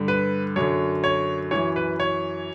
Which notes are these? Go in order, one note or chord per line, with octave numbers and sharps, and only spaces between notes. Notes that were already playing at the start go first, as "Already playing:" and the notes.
Already playing: G2 D3
B4
F#2 D3 C#5
C#5
F#2 E3 C#5
B4
C#5